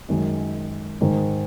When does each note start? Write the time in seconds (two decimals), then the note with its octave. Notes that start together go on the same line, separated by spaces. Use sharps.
0.08 F#2 D#3 G#3
1.01 G#2 D#3 G#3